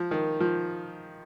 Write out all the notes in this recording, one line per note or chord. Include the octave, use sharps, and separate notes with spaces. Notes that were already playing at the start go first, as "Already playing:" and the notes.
Already playing: F3
D#3
F3